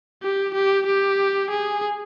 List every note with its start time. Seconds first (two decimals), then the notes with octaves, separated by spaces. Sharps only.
0.23 G4
0.54 G4
0.86 G4
1.50 G#4